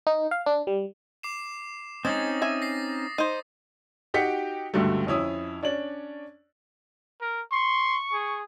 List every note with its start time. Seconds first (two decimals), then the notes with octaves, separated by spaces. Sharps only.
0.07 D#4
0.31 F5
0.46 D4
0.67 G3
1.23 D6 C7 E7
2.05 G#3 C4 C#4 D#4 D#6 A6
2.42 E5 G#5
2.62 A#6 C7
3.18 D#4 C5
4.14 D#4 F#4 G4 G5 B6 C#7
4.74 C#2 G2 D3 F#3 G3 A3
5.07 F2 C#4 E4 D#6
5.63 C#4 D4 D5 F#7
7.21 A#4
7.52 C6 C#6
8.13 G#4